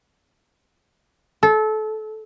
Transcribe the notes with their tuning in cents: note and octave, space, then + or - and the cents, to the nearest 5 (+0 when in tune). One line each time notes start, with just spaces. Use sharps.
A4 -25